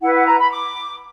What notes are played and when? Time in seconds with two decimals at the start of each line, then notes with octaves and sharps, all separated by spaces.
0.01 E4 B4 F#5
0.14 F#5
0.26 A#5
0.38 B5
0.50 D6